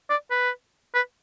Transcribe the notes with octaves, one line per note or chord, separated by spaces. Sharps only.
D5
B4
B4